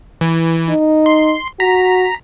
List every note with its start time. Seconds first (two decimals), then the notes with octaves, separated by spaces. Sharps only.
0.21 E3
0.69 D#4
1.06 C6
1.60 F#4 A#5 B6